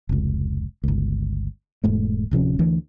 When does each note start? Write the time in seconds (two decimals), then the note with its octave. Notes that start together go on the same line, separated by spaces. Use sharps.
0.09 F1 C#2
0.84 G1 C#2
1.84 E1 G#2 A3
2.31 D1 C3 F3 C#4
2.59 D2 E3